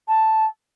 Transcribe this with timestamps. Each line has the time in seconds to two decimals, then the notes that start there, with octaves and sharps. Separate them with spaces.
0.08 A5